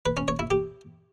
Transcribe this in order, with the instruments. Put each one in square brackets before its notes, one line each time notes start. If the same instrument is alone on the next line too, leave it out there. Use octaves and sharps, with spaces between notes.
[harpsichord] B4
C#4
C#5
E4
G4